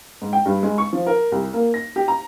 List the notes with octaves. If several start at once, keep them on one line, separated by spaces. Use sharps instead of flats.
G#2
G5
G2
G#3
C#6
F3
A#4
C2
A#3
A#6
G4
A#5